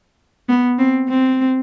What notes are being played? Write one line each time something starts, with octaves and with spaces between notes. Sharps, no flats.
B3
C4
C4